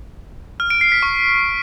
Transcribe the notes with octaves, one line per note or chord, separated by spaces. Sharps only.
F6
D7
C7
B6
C#6